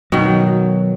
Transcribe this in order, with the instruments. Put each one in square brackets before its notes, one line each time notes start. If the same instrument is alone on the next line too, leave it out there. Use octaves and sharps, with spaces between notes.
[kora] B2 D#3 [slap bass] F#3